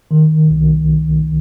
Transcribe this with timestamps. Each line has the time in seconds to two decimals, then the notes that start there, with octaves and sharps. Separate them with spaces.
0.11 D#3
0.50 C2